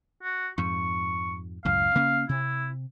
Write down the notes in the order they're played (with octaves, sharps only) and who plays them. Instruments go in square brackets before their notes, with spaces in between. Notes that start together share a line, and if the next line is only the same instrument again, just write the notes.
[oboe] F#4
[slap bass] F2 G#2 [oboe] C#6
[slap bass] C#2 F#2 A2 [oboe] F5
[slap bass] C#3 A#3 C#4
[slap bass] C3 [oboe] E4